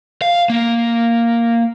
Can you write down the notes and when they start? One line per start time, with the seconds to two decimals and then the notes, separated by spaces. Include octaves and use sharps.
0.22 F5
0.50 A#3